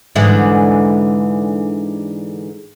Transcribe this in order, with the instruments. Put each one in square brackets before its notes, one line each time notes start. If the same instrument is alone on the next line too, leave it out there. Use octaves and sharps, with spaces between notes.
[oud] G#2 D3 E3